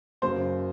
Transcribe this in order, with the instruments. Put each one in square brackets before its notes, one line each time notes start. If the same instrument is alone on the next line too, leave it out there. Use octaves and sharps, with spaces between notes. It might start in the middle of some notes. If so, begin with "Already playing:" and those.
[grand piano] F#1 F#2 C#3 [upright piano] C5